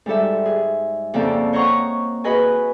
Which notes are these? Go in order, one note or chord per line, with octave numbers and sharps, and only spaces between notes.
G#2 G3 A4 E5
G#4
F2 C#3 A#3 C4 A4 D5
C5 C#5 D#5 F#5 A#5 C#6
F#4 G#4 B4 D#5 G#5